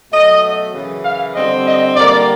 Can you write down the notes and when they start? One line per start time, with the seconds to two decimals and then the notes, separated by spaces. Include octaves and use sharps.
0.11 B2 F#3 A3 D#5
0.73 F#2 C#3 E3
1.03 F5
1.34 D3 G3 C4 D#5
1.65 D#5
1.95 D3 G3 A#3 D5